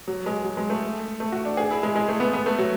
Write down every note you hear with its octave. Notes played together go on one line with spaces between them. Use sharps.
F#3
G#3
F#3
G#3
A3
A3
F#4
D4
G#4
E4
G#3
G#3
A3
B3
B3
A3
F#3